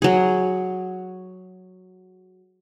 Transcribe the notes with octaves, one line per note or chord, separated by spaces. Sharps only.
F#3 G#4